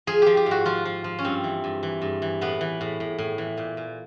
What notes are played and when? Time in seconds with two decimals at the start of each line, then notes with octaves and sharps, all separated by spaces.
0.07 F3 G#4
0.22 F3 G4
0.37 G4
0.46 G#2
0.51 F#4
0.65 F3 F4
0.85 F3
1.04 F3
1.19 C#4
1.24 G2 C4
1.44 E3
1.64 G2
1.83 E3
2.02 G2
2.22 E3
2.41 A2 B3
2.61 E3
2.81 A2
3.00 A2
3.18 A2
3.38 E3
3.57 A#2
3.77 A#2